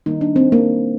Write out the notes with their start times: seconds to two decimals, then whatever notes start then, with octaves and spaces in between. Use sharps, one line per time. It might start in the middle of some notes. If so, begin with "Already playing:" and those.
0.06 D#3 G3 A#3 D#4
0.21 D4
0.36 C4
0.52 A#3